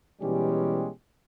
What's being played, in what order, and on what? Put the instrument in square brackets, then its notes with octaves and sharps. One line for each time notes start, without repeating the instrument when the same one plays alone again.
[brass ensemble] B2 E3 G3 G#3 C#4 G4